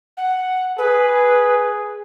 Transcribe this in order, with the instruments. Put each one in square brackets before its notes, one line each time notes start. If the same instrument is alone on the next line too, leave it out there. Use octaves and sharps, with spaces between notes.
[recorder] F#5
[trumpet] G#4 [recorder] B4